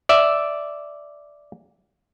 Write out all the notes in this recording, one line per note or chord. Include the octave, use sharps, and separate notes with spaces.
D5 E5